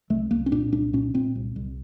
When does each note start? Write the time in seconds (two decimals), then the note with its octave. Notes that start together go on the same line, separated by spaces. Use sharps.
0.10 C2 A3
0.31 C2 A#3
0.46 C#4
0.52 A#2 D4
0.72 C2 D4
0.93 A#2 C#4
1.14 A#2 C4
1.35 C2
1.56 C2